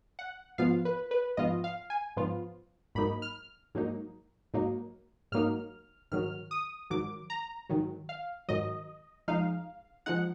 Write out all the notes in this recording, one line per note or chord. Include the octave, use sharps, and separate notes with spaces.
F#5
G#2 F3 B3 F4 F5
B4
B4
G#2 F3 B3 F4 D#5
F5
G#5
G#2 F3 B3 F4
G#2 F#3 A#3 D#4 B5
F6
G#2 F#3 A#3 D#4
G#2 F#3 A#3 D#4
G#2 F#3 A#3 D#4 F6
G#2 D#3 F#3 F6
D#6
G#2 D#3 F#3 D6
A#5
G#2 D#3 F#3
F5
G#2 D#3 F#3 D#5
F2 F3 G#3 D#4 F5
F3 G#3 D#4 F#5